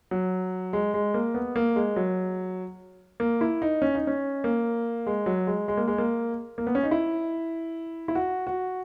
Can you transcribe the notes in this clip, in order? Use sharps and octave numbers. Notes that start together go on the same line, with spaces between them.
F#3
G#3
G#3
A#3
B3
A#3
G#3
F#3
A#3
E4
D#4
C#4
D#4
C#4
A#3
G#3
F#3
G#3
G#3
A#3
G#3
A#3
A#3
B3
C#4
D#4
E4
E4
F#4
F#4